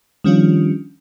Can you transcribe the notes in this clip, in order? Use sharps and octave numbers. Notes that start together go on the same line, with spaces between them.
D#3 F3 G3 C#4 D4 F4